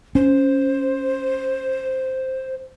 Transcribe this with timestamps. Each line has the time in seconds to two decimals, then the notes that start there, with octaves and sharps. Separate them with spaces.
0.15 C#4 C5